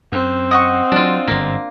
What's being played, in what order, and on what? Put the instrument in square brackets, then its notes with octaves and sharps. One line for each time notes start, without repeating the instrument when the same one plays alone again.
[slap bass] F#2 [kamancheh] C4
[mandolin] D#5 F#5 C#6
[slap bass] F#3 [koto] D4 F4
[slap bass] G1 G#2 [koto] A#3